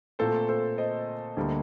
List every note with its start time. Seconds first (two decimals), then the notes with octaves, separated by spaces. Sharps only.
0.19 A#2 A3 C4 A4 C5
0.49 A4 C5
0.78 C5 D#5
1.37 D2 D3 G3 A#3